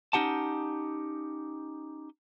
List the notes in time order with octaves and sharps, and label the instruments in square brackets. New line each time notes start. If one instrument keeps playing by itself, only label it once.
[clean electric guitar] C#4 D#4 G4 F#5 A5